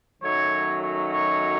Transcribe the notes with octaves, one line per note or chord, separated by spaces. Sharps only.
F#2 D#3 F#3 A3 D#4 C#5
C#5
C#5